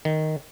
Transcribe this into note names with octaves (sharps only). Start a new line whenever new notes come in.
D#3